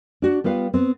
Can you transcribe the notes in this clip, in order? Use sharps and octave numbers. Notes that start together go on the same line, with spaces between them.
D4 F#4
G3 B3 F4 B4 F5
B3 C4